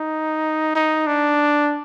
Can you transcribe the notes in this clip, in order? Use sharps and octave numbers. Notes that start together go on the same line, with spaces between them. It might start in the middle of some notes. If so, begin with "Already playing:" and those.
Already playing: D#4
D#4
D4